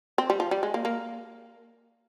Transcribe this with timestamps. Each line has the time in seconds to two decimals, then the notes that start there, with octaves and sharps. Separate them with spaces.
0.18 C4
0.30 G3
0.40 F3
0.51 G3
0.63 G#3
0.74 A#3
0.85 A#3